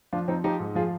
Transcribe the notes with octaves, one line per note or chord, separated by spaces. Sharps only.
F3 D4 F4
F3 C4 D#4
F3 D#4 G4
G#2
F3 F4 G#4